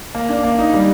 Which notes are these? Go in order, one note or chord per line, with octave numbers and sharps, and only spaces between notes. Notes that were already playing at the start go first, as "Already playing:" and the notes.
A#3
D4
A#3
D#4
G3